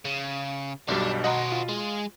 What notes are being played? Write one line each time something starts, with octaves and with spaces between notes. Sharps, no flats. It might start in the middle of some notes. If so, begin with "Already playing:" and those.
C#3
B1 G2 B2 G3 D4
F#4 C5 D#5 F#5 A#5
F4
G#3